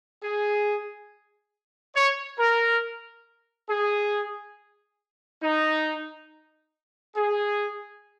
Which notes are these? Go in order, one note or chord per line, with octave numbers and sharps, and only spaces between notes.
G#4
C#5
A#4
G#4
D#4
G#4